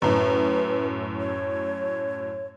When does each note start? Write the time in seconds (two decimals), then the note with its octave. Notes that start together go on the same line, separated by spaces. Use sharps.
0.02 F#2 A2 B4
1.20 C#5